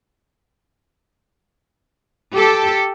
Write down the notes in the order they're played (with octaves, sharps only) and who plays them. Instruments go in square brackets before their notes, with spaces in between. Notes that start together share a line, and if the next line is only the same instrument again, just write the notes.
[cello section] G4 A4